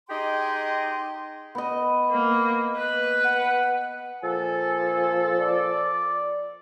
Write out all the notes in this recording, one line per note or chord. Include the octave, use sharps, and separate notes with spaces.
D#4 G4 G#4 D#5 G5 C6
B3 D#5
A#3
B4
F#5
A#2 F3 A4 G#5
D5